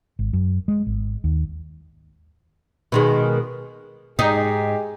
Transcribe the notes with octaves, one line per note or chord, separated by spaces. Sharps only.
G#1
F#2
G#3
G#1
D#2
B2 D#3 G#3
G#2 G#3 D#4 G4